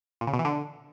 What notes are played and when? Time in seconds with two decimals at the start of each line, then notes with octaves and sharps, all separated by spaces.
0.21 A#2
0.27 C#3
0.33 B2
0.39 E3
0.45 D3